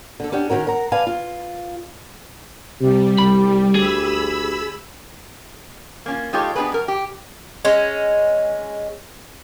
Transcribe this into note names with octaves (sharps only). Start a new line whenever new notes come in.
D3 A4
C#4 D4 G4 F#5
D#3 E3 C#4 F#4 A#4
A#4 F#5 A#5
B4 D5 F5 G#5 A5
F4
C3 G3 G4
C2 B5
D2 G#4 B5 E6
A#3 C#4 F4
G#3 D#4 F4 G4 A4 C#5
B3 D4 E4 G4 G#4 B4
F#2 A#4
G4
G#3 C#4